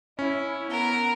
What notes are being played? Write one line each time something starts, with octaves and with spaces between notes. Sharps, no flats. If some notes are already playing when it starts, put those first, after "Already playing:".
C#4 E4
B3 A#4